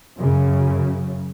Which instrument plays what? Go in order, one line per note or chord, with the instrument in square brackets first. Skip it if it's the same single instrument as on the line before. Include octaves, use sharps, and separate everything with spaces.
[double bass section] F#2 C#3